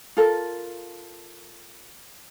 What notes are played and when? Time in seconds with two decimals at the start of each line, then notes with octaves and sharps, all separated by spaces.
0.17 F4 A4 A#4